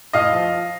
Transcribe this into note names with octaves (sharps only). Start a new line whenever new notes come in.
A2 D#5 F5
F3